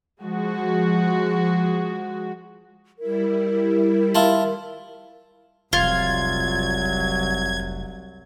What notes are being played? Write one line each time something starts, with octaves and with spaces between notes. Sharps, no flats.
F3 G#3 F#4
G3 E4 A#4
E4 F4 A5
F1 C2 F#3 F4 G#6